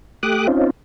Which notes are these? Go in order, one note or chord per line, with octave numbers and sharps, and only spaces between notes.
A3 G4 D6 D#6 F#6
C4 C#4 D#4 F4